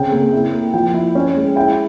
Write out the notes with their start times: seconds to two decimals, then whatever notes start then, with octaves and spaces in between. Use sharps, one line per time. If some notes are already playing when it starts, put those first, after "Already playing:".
Already playing: C#3 C4 G5
0.11 A#3
0.33 E4
0.53 A#3
0.74 F3 G5
0.94 E4
1.15 C#4
1.36 G#3
1.56 E4 G5